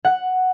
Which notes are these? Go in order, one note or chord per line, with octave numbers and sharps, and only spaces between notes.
F#5